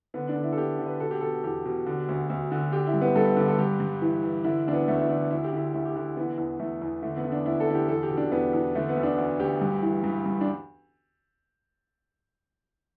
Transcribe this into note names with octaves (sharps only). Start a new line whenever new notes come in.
D3 B3
D4
D3
E4
A4
D3 G4
D3
B4
B2 A4
G4
B2 A4
E2 G4
B2
D3
D2
D2
D3
D3 G4
E4
G2
B3
G2 A4
D3
A4
G2 G4
G2
E3
E3
D3 E4
D2 D4
B3
D2 A3
E4
D3 D4
D2 E4
G4
D3 E4
D2 E4
G4
D3 E4
E3 B3
E2
E2 A3
E2
D3 A3
B3
D3
D4
D2 E4
A4
D3 E4
G4
E2 A4
G4
B2
D4
E2 B3
E2
D3 A3
B3
D2
D4
D2
D2 G4
G2
E3
G2
G2
D4